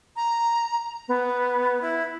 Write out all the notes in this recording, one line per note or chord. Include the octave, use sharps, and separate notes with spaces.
A#5
B3
E4